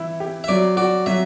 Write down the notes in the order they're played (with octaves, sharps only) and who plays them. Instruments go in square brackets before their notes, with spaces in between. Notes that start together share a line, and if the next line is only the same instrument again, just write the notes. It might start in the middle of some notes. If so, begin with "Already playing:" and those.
Already playing: [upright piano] E3 E4
G4
[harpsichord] E5
[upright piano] F#3 [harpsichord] D5
[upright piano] F#4 [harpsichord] D5
[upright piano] F#3 [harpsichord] E5